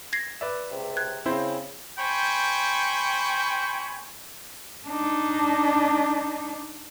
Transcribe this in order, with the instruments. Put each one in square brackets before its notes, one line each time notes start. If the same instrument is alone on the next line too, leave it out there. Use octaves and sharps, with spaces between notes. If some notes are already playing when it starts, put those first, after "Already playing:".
[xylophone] G#6 A#6 C7
[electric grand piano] B4 D5 E5
[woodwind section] C#2 C3
[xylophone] F#6 G#6
[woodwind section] C#3 [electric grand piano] C4 E4 C5
[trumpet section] C5 G5 G#5 B5 C#6
[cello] D4 D#4